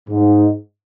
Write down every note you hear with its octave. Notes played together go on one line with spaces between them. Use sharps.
G#2